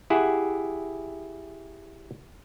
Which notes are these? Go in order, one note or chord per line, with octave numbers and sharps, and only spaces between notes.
E4 G4 G#4 E5 F#5